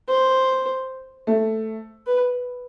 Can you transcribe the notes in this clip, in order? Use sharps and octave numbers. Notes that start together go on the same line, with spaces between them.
C5
A3
B4